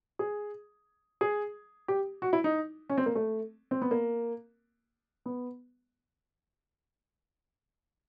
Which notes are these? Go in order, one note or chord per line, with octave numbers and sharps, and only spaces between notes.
G#4
G#4
G4
F#4
E4
D#4
C#4
C4
A#3
A3
C4
B3
A#3
B3